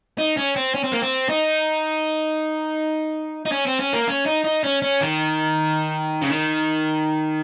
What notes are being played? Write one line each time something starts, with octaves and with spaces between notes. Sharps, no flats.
D#4
C#4
C4
C#4
C4
A#3
C4
D#4
D#4
C#4
C4
C#4
A#3
C#4
D#4
D#4
C#4
C#4
D#3
C#3
D#3